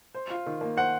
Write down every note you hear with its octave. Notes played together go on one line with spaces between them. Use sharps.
C5
F4
D#3
A#3
C5 F#5